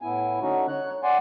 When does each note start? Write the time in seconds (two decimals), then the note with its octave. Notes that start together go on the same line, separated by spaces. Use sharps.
0.02 A2 B3 E4 G#5
0.42 D3 C#4 D#4 F#4
0.68 C#5 F#6
1.03 D5 F#5 G#5 C6